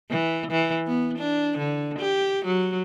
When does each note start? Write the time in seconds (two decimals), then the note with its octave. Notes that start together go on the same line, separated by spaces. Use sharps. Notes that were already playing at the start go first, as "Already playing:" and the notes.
0.10 E3
0.51 E3
0.87 B3
1.18 D4
1.58 D3
1.99 G4
2.45 F#3